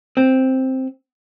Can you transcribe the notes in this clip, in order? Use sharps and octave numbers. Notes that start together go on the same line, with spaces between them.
C4